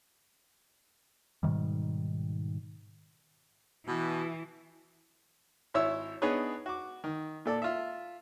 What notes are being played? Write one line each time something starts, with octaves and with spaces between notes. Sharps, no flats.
G#2 B2 D#3 G3
B2 E3
G#1 E4 C#5 E5 E6
B3 D4 D#4 G#4 B4 C#5
F#4 D6
D#3
A#2 A4 D5
F4 E5